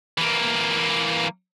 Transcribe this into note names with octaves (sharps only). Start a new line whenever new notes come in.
E3 A#3